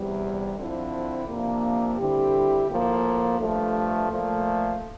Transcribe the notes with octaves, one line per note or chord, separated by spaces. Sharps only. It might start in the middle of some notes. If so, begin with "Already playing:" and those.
Already playing: E2 C3 G3
D3 F3 C4 E4
C3 F3 A#3 D4
D3 G3 C4 E4 G4
A2 F3 A#3
G2 F3 A3
A#2 F3 A3